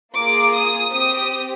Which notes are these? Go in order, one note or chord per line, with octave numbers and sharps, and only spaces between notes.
A#3 F4 G#4 D6
D#6
C4 G4 D#6